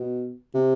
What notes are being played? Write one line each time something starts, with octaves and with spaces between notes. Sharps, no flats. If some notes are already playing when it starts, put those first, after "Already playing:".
Already playing: B2
C3